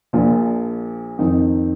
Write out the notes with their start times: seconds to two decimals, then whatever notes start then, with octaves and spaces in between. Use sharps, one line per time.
0.13 A#1 A#2 F3
1.19 F2 D#3 C4 D#4